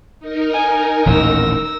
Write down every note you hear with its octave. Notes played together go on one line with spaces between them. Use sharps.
D#4 A#4
G#5
D#1 A1 D#2 E6 A#6